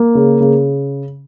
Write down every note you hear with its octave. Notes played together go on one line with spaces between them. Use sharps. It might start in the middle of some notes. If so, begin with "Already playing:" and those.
Already playing: A#3
C#3
C#3